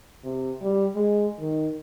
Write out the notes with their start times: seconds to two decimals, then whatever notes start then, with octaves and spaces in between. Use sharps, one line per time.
0.24 C3
0.62 G3
0.96 G#3
1.39 D#3